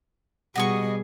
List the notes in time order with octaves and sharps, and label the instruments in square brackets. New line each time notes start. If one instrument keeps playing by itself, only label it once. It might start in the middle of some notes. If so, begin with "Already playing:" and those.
[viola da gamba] B2 G3 G#4 [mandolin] F#4 D#5 C#6